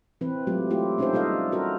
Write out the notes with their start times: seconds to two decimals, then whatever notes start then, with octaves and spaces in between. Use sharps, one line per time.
0.21 E3 C4 B4
0.47 F#3 G#3 A3 F4 G4
0.70 A3 E4 F4 G4
0.98 A#3 C#4 D#4 G#4 A4 C5
1.13 G3 F4 A4 D#5 F5
1.52 C#4 F#4 A4 A#4